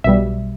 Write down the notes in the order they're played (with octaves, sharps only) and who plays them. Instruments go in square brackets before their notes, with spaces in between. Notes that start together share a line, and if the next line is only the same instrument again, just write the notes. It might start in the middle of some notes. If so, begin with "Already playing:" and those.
[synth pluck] B1 B2 G3 E5